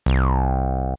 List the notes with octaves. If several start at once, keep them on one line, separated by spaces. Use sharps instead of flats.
C2